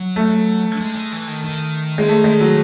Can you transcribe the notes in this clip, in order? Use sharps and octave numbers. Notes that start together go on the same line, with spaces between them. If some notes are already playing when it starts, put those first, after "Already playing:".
Already playing: F#3
A3
G#3
G#3
E3
D#3
D#3
G#3
A3
G#3
F#3